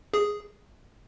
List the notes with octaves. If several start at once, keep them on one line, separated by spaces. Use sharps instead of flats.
G#4